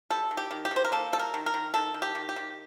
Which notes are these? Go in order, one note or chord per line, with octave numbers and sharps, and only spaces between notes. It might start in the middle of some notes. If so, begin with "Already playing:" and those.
G3 A4
D#3
G4
D#3
G4
D#3
C5
A#4
A#3 A4
G3 A4
A#4
D#3
A#4
D#3
D#3 A4
D#3
G4
D#3
G4
D#3